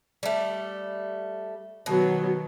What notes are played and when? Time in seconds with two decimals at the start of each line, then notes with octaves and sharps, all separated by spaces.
0.23 G3 A3
1.86 B2 D#3 F#3 B3